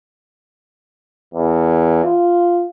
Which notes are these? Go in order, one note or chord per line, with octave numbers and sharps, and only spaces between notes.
E2
F4